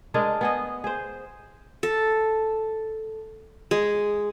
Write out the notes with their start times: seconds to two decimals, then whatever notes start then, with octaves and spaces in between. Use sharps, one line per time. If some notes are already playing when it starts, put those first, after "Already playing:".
0.14 G#3 D4 G#4 A#4
0.41 B3 G#4 D#5
0.84 G#4 C5
1.83 A4
3.71 G#3